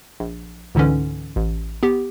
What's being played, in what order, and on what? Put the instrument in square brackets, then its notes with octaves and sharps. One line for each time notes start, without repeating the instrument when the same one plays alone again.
[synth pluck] A#1
C#2 G#2 D3 E3 C#4
A1
B3 G4